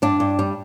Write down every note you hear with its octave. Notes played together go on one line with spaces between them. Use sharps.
G2 D4
G2
G3